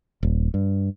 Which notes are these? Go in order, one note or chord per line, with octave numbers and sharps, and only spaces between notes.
D#1
G2